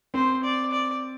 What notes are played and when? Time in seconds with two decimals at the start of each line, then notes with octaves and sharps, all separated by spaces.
0.14 C4 C5
0.44 D5
0.72 D5